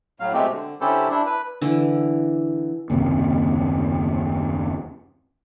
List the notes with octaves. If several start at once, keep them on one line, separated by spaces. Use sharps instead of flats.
A2 F#3 F5
B2 G#3 A3 C4 G4
D3
D3 C#4 E4 G4 A4 C5
D4 E4
B4
D3 E3
F#1 D#2 C3